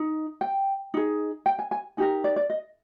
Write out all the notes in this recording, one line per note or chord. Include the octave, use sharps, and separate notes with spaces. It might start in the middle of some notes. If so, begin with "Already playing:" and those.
Already playing: D#4
G5
D#4 G#4
G5
G#5
G#5
D#4 G4 A#4 G#5
D5
D5
D#5